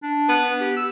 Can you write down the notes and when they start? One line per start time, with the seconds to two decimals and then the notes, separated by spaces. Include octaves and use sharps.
0.03 D4
0.29 B3
0.60 G4
0.77 E6